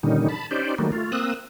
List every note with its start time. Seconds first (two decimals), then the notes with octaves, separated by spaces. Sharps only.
0.03 A#2 D3 D#3 G3 C#4 D#4
0.28 A5 B5
0.51 C#4 D#4 G4 C5 D5
0.78 D#3 F#3 G3 A3 A#3
0.92 A3 F4
1.12 A#3 C4 D#6 E6 F#6